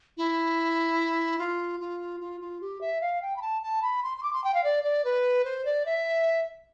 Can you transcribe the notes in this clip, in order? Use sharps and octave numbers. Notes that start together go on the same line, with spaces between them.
E4
F4
F4
F4
F4
G4
E5
F5
G5
B5
A5
A5
B5
C6
C6
D6
C6
G5
F5
D5
D5
B4
C5
D5
E5